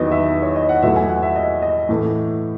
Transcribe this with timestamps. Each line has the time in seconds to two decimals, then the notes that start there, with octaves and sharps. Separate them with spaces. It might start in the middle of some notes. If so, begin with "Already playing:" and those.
Already playing: E2 D#3 F#3 B3 D#5
0.11 E5
0.42 C#5
0.56 D#5
0.69 F#5
0.82 E2 B2 F#3 A3 E5
0.96 G#5
1.09 F#5
1.22 E5
1.36 D#5
1.62 D#5
1.89 A2 E3 A3